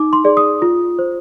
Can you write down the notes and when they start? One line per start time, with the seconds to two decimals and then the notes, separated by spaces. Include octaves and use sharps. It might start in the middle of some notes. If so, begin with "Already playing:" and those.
Already playing: D#4 D6
0.13 C6
0.24 G#4 D5
0.37 D#6
0.62 F4
0.99 C5